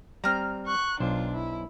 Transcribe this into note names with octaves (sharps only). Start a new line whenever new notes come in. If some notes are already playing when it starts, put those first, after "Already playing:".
G3 C4 A#5 F6
C#6 F#6
B1 D4 F4 C5
E4